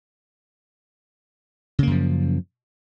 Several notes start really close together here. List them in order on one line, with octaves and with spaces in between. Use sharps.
C#3 A#3 F#2 F3